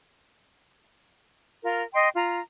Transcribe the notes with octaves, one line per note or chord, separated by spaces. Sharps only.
F4 A#4
D#5 G5 C6
F4 A#5